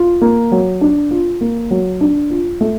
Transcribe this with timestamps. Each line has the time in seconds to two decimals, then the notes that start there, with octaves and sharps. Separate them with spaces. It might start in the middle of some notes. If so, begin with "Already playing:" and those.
Already playing: F4
0.21 A#3
0.52 F#3
0.81 D4
1.11 F4
1.41 A#3
1.71 F#3
2.01 D4
2.30 F4
2.61 A3